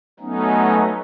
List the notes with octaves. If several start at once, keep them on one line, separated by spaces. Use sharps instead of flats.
F#3 A3 B3 C#4 D#4